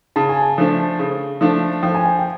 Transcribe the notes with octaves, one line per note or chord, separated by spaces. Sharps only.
C#3 A5
G#5
A5
F3 A3 D4
C#3
F3 A3 D4
F3 G5
G#5
G5
G5